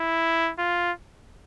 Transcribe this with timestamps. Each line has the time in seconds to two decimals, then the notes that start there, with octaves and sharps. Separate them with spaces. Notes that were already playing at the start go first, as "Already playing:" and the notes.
Already playing: E4
0.59 F4